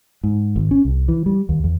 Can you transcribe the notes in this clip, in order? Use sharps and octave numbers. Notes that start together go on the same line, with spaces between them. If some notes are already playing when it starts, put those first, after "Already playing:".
G#2
G#1
C#4
C2
E3
G3
D#2
E2